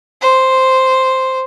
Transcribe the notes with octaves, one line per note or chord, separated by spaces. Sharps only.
C5